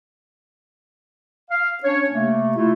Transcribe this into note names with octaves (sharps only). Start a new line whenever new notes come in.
F5
C#4 D4 C#5
C3 A3 A#3
A3 E4 F4